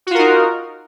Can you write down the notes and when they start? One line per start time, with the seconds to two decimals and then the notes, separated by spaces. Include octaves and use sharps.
0.07 F#4
0.11 F4
0.15 A#4
0.19 D#4